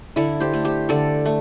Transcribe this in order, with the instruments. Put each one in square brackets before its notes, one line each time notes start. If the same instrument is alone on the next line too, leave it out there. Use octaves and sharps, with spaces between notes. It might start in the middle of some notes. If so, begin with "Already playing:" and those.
[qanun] D3 E4 A4
G4 C5
A3
G4 C5
D3 A4 D5
A3